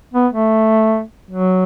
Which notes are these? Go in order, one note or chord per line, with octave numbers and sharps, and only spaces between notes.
B3
A3
F#3